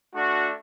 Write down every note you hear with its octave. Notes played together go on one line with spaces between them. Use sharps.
A3 D4 F#4